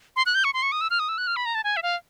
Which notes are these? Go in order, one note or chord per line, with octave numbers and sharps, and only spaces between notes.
C6
F#6
G6
C#6
C6
C#6
D#6
E6
F6
D#6
E6
F#6
F6
B5
A#5
A5
G#5
E5
F5